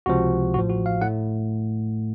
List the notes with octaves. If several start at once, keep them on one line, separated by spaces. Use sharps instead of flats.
C#2 C3 F3 F#4
A1 A2 F3 F#4
F#4
F5
A2 A3 F#5